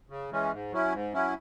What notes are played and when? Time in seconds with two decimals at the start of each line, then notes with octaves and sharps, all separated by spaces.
0.10 C#3
0.31 E3 G#3 C#4
0.52 G#2
0.72 F#3 C#4 E4
0.92 G#2
1.13 F#3 C#4 E4